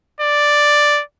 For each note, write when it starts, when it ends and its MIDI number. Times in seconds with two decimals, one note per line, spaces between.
0.21 1.02 74